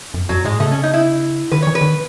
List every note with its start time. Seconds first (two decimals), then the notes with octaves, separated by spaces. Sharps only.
0.14 F#2
0.29 F#2 F#3
0.44 A2 G#3
0.60 C#3 A3
0.71 C#4
0.83 D#4
0.94 E4
1.51 D#3 B4
1.62 E3 C#5
1.75 B4
1.81 D#3